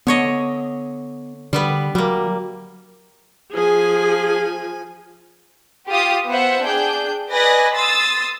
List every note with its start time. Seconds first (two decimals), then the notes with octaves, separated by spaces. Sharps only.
0.07 D3 B3 C#5 D#5
1.53 D3 G3 B3 B4
1.95 F#3 G3 A#3
3.54 F3 G#4 G#5
5.89 F4 G4 D#6
6.28 B3 C5 E5 F#5
6.63 D4 G#4 G5 G6
7.31 B4 D5 D#5 G#5 A#6
7.75 C6 D#6 E6 A6